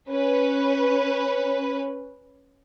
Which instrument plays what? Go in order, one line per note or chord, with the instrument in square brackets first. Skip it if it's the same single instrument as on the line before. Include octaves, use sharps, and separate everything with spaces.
[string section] C#4 B4